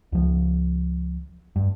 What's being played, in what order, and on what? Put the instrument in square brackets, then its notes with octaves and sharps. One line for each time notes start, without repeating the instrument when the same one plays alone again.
[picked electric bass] C#2 F3
G2